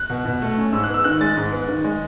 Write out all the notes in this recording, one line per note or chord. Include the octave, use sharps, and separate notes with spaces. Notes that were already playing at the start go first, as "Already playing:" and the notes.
Already playing: F#6
B2
B2
A3
C#4
G#2 E6
F#6
B3
E6
D#3 F#6
G#3 A6
G#2
B3
D#3
G#3